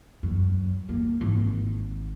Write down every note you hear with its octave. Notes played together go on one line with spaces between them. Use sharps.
F#2
A#3
G#1